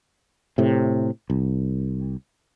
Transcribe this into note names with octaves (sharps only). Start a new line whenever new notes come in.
A2 C3
C2